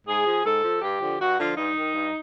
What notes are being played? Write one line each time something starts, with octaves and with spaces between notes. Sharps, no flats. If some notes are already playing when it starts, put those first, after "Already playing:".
G#2 G#4
F3
G#2 A4
F3
G2 G4
D3 F3
G2 F#4
D3 F3 F4
G2 D#4
D#3
G2